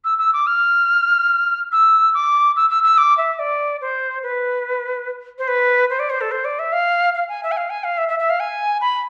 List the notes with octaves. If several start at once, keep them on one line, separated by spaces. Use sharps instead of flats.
E6
E6
D6
F6
E6
D6
E6
E6
E6
D6
E5
D5
C5
B4
C5
B4
C5
D5
C5
A4
C5
D5
E5
F5
F5
G#5
E5
G#5
F5
G#5
F5
E5
E5
E5
F5
G#5
B5